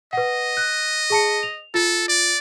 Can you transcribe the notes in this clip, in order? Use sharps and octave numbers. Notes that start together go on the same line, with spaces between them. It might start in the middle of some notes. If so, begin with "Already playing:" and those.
B4 D#5 F#5
F#6
G#4 A5 C#7
F7
F4 A4
D5